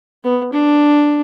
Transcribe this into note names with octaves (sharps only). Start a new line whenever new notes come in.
B3
D4